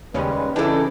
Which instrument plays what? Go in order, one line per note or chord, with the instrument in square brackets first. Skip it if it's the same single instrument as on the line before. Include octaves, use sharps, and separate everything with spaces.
[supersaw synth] D#2 C#3 C#4 [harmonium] G3 G#3 B4
[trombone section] C#3 E3 [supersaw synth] D4 D6 [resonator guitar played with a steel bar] D#4 A4 [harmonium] B4 G#5